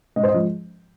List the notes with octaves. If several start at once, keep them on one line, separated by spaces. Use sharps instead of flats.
G#2 D#5
C5
D#5
F3 G#3